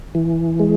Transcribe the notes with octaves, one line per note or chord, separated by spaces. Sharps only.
E3
G#3